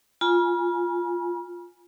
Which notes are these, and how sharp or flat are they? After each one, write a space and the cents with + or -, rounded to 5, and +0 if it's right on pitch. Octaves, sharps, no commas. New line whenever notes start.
F4 +0 G#5 +0 B5 -40